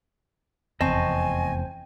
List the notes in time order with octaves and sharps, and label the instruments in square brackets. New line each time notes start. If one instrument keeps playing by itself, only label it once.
[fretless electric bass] F1 E2 [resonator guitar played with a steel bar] C4 [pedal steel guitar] D#5 A5 C#6 [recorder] G#5